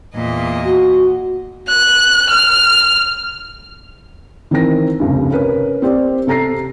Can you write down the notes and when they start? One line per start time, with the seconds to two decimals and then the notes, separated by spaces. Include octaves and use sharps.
0.13 E2 A#2 D#5
0.66 F#4
1.68 F#6
2.30 F6
4.51 D#3 E3 C4 A#4 A#6
5.00 F1 C#2 G2
5.32 C#4 A#4 B4
5.82 C4 G4 C5 D5
6.27 C3 A4 A#5 A#6 C7